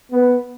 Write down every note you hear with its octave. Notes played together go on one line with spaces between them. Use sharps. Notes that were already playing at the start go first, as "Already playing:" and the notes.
B3